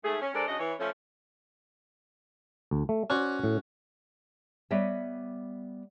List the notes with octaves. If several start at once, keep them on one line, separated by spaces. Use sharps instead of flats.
G#2 A3 G#4
C#4
G#3 D4 A4 A#4 C5 D5
C#3 D4 F#4 D#5
E3 C#5
F3 A3 C#4
D2
A3
C#4 F#4 C5 D5
A2
G3 B3 C#5 D#5 E5